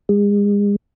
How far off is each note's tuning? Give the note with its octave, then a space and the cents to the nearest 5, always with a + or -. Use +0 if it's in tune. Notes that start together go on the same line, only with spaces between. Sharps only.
G#3 -35